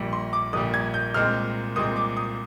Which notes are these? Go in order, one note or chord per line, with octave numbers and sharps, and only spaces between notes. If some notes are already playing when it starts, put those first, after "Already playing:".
Already playing: A#1 A#2 G3
C6
D6
A#1 A#2 G3 D#6
G#6
G6
C2 A#2 G#3 C4 F6
C2 A#2 G#3 C4 D#6
D6
D#6